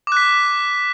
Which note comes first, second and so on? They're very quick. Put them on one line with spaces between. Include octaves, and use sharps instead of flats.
D6 F#6 B6